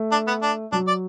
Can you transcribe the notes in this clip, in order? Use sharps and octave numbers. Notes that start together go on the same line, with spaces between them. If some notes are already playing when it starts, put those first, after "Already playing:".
Already playing: A3
D4
B3
D4
F#3 D4
D5